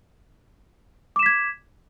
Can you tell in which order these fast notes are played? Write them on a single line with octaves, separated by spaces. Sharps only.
D6 E7 B6 G#6